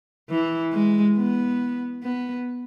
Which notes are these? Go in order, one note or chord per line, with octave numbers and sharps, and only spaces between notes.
E3
G#3
B3
B3